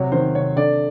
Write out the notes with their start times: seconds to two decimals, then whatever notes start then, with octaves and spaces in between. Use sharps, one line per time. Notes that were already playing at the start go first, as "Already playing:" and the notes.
Already playing: C3 F#3 C#5
0.12 D#3 C5
0.35 C3 C#5
0.56 D3 D5